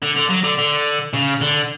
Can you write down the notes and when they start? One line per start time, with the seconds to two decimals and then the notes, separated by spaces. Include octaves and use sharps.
0.02 D3
0.16 D3
0.30 F#3
0.43 D3
0.58 D3
1.14 C#3
1.41 D3